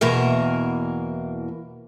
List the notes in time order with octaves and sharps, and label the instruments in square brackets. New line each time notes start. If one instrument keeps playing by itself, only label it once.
[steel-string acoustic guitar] E2 B2 E3 A#3 A#4 E5